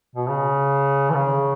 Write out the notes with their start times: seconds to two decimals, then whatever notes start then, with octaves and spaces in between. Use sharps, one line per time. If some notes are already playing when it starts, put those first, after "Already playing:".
0.16 B2
0.29 C#3
1.10 E3
1.15 C#3